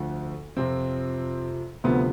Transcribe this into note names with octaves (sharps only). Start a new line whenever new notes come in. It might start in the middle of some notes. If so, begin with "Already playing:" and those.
Already playing: D2 D3 F3
F2 C3 F3 C4
D2 C3 F3 B3